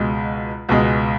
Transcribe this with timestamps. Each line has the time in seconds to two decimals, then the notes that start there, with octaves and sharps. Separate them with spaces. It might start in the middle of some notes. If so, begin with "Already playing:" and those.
Already playing: C#2 B2 G#3
0.69 C#2 B2 G#3